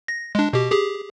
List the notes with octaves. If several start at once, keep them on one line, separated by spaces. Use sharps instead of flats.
A#6
G#3 D4
B2 G4
G4 G#4